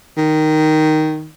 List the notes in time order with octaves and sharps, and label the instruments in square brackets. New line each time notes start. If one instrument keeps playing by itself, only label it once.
[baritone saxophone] D#3